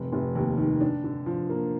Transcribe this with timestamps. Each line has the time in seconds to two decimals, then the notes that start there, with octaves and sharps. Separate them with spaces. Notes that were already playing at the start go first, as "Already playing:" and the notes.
Already playing: F1
0.12 F1
0.35 D#2
0.57 D#3
0.81 D4
1.04 D3
1.26 F3
1.50 A#3